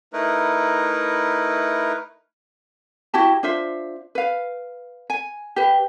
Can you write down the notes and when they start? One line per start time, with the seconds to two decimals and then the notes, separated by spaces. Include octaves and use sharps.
0.13 A3 D#4 E4 A#4 B4
3.14 E4 F#4 G4 A5
3.43 D4 F4 C5 E5
4.15 B4 F5
5.10 G#5
5.56 G4 B4